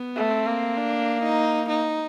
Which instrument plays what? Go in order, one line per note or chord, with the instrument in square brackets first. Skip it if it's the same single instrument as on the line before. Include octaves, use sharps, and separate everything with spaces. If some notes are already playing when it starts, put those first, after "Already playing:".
Already playing: [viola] B3
[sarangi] A3
[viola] C4
[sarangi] A#3
[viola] D4
D#4
D#4